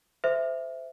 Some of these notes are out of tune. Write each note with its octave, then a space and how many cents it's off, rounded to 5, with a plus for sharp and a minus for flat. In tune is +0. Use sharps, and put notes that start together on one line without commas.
A4 +0 C5 -20 E5 +5